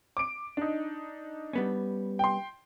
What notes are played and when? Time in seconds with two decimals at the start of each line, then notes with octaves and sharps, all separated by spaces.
0.17 D6 D7
0.57 D4 D#4
1.53 G3 B3 C#4
2.19 G5 C6